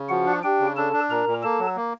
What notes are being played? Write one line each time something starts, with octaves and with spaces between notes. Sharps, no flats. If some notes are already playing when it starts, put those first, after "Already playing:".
Already playing: C#3
F3 F#4 F#5
D4
D4 G4 G5
C#3
D4 A4 A5
D4
A#2 A#4 A#5
A#2
A#3 A4 A5
F#3
A#3